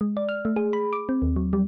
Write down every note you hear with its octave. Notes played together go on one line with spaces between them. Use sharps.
G#3
D5
F6
A3
G#4
B5
D6
C4
D#2
F#3
G3